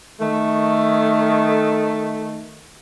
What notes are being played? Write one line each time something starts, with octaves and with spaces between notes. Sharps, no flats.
D#3 A3